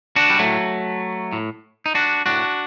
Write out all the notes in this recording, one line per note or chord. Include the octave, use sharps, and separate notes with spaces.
D4 F#4
G3
A2 F#3 A3
A2
D#4
D4 F#4
A2 D4 F#4